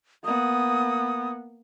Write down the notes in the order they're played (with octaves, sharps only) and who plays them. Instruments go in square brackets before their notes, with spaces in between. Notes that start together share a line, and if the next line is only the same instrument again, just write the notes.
[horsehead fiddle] A#3 B3 [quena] D#6